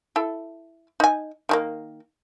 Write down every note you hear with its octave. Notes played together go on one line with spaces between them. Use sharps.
E4 A4
D#4 G#5
D#3 A3 A#3